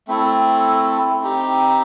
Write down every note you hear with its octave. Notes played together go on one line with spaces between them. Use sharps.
A3 C4 E4 A4
C4 D#4 G4